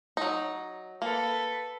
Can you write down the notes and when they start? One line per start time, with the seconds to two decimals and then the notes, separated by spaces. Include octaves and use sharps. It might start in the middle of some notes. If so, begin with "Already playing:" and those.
0.17 F#3 D#4
1.02 A#3 A4 B4